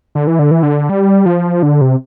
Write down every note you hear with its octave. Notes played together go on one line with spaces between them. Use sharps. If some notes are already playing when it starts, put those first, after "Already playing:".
D3
E3
D3
E3
D3
G3
F3
D3
C3